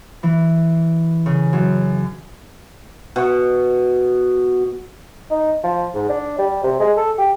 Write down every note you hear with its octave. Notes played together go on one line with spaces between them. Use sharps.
E3
C#3
F#2
B2 C#6
D#4
F3
G#2
D4
G3
C3
G#3
A4
G4